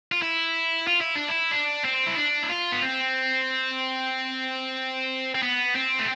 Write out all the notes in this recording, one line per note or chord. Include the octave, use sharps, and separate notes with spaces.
F4
E4
F4
E4
D4
E4
D4
C4
E4
D4
E4
F4
B3
C4
C4
B3
C4
A3